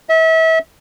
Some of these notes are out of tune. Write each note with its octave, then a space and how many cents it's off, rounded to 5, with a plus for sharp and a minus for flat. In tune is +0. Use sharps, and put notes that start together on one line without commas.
E5 -35